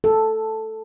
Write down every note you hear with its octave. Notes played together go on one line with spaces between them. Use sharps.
A4